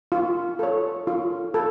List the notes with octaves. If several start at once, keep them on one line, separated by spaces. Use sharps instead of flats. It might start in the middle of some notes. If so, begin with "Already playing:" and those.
F4
A4 C#5
F4
A4